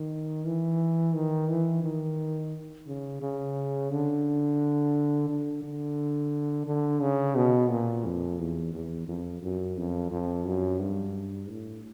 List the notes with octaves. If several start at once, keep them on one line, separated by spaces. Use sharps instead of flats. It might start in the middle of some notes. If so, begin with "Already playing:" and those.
Already playing: D#3
E3
D#3
E3
D#3
C#3
C#3
D3
D3
D3
D3
C#3
B2
A#2
F2
E2
E2
F2
F#2
F2
F2
F#2
G2
A2